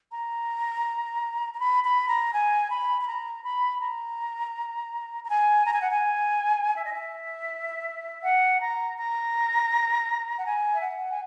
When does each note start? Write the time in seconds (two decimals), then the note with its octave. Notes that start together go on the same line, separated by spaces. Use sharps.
0.11 A#5
1.54 A#5
1.59 B5
1.84 B5
2.09 A#5
2.33 G#5
2.70 B5
3.00 B5
3.07 A#5
3.43 B5
3.80 A#5
5.23 A#5
5.28 G#5
5.65 A#5
5.73 G#5
5.81 F#5
5.90 G#5
6.75 E5
6.85 D#5
6.93 E5
8.23 F#5
8.61 A#5
8.97 A#5
10.37 F#5
10.45 G#5
10.74 E5
10.82 F#5
11.09 G#5